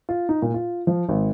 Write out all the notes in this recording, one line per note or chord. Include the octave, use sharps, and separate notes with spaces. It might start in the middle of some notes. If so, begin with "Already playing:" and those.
F4
D#4
A#2
F4
F3
G#1